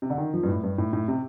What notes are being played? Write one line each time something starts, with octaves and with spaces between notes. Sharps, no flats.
C3
D3
D#3
F3
G2
A2
G2
A2
A2
C3